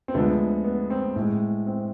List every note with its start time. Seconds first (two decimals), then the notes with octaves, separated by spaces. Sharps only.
0.08 C4
0.14 D2 D3 F3 G#3 B3
0.65 B3
0.90 C4
1.16 A2 G#3
1.67 C4